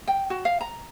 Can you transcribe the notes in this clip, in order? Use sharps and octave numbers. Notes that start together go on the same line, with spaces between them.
G5
F#4
F5
A#5